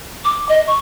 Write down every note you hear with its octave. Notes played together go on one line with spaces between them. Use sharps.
D6
D#5
C#6